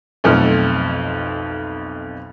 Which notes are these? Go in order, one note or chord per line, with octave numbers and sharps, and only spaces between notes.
B1 F2 A3 F6